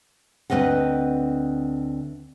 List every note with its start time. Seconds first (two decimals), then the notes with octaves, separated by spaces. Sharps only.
0.50 D2 E3 C4 B4 D#5 F#5